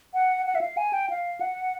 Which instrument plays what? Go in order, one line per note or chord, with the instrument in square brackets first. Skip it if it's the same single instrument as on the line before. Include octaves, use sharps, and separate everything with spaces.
[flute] F#5
F#5
E5
F5
G#5
G5
F5
F#5